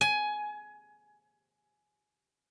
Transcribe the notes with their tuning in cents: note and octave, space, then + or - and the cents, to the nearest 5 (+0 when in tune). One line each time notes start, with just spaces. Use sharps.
G#5 +15